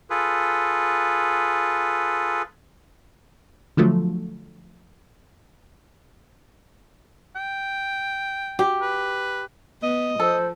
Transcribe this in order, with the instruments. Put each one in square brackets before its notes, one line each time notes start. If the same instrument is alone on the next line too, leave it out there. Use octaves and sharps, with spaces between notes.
[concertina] F4 G#4 A4 B4
[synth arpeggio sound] D3 F3 F#3 A3
[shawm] G5
[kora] G4
[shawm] B4
[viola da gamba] B3 [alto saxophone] D#5
[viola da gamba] F3 [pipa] A4 [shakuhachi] C5